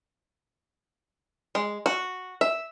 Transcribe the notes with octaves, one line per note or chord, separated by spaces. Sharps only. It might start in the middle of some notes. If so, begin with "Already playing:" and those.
G#3
F#4
E5